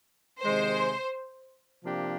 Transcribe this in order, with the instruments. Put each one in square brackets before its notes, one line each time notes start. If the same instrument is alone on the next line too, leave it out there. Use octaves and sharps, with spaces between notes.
[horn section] C3 D#3 G#3 [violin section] C5
[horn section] C3 F3 A#3 D4 G4